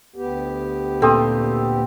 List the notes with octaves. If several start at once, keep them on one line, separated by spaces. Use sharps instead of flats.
D2 B3 G4
A#2 C4 A4 G5 D#6